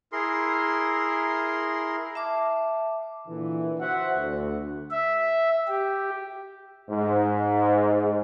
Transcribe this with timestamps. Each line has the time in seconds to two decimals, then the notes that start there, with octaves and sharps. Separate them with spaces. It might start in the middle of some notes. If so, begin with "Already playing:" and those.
0.12 E4 G#4 A#4 C6
2.15 E5 A5 D6
3.27 A#2 D3 E3
3.79 F#4 C5 E5 F#5
4.17 D2
4.91 E5
5.68 G4
6.90 G#2